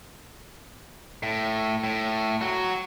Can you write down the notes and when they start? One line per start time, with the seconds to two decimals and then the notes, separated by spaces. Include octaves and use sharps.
1.23 A2
1.84 A2
2.41 F#3 F#4